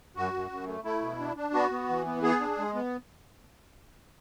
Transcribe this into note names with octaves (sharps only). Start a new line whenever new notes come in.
F#2 F#4
F#2
F#2
A3
A3 E4
B2
D4
D4
B3 F#4
B3
E3
B3
B3 G#4
D4
G#3
B3